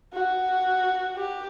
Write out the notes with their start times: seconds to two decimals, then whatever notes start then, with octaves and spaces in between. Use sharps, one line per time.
0.13 F#4
1.16 G4